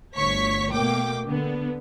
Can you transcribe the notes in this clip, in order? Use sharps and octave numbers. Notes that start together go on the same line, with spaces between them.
G1 D2 C#5 C#6 B6
B2 A3 A#3 G5 D6
D3 B3